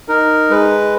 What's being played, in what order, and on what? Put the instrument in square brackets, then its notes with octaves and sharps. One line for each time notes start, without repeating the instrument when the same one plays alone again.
[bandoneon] D#4 A#4
G#3 B4